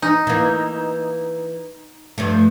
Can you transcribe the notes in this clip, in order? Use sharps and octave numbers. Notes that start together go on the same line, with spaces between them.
D#4
E3 A#3
G2 F3 A3